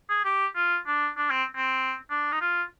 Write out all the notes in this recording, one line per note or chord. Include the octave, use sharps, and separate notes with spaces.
G#4
G4
F4
D4
D4
C4
C4
D4
D#4
F4